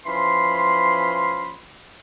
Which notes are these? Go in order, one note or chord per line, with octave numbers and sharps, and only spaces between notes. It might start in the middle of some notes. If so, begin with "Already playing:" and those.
E3 F3 C#4 B5 C6